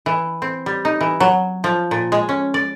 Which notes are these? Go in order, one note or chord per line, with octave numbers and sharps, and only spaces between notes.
E3
C4
G3
D#4
E3
F#3
F3
A#2
G#3
C#4
D5